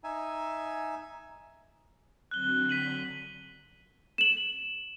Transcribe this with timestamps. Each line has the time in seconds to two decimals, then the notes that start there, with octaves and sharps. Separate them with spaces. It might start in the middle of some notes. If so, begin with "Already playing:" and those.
0.04 D#4 E5 G#5
2.31 D3 F#3 C4 F#6 G7
2.69 B6 D#7 F#7
4.18 E7 F#7